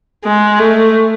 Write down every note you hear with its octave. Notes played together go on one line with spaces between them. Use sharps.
G#3
A3